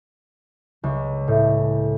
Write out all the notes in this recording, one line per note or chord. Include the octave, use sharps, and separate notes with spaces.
C#2
A2